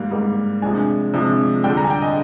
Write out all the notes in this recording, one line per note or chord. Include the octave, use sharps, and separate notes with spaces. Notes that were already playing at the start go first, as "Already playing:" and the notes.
Already playing: G#2 G3 A#3 F5
G#2 G3 A#3
C3 F3 G#3 D4 G#5
C3 F3 G#3 D4
D3 G3 D4 G5
A#5
G#5
G5
D#5